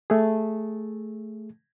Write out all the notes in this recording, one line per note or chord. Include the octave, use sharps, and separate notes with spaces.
A3 G#4